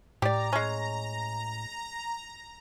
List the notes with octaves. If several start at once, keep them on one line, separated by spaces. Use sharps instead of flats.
A2 G4 D5 A#5
G#3 C#4